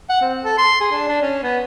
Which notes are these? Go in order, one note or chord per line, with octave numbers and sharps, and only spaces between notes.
F#5
C4
A4
C6
G#4
D4
D4
C#4
B3